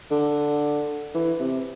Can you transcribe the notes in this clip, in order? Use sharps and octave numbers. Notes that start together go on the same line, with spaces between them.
D3
E3
C3